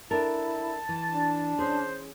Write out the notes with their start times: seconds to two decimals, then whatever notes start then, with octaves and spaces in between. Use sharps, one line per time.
0.11 D4 E4 A4 A#4 A5
0.23 A5
0.89 E3
1.10 D4
1.59 C#4 G#4 C5